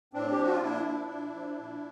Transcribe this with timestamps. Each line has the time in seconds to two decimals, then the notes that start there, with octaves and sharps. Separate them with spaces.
0.13 A2 C4 D4
0.32 G4
0.38 F3 F#4
0.52 F4
0.62 A#2 D4 E4
0.86 F3
1.11 A#2
1.35 F3
1.58 A#2